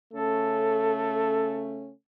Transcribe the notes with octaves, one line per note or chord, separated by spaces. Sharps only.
C#3 A3 C#4 A4